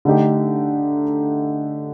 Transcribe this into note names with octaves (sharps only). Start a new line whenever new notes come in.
D3 A3 D#4 G4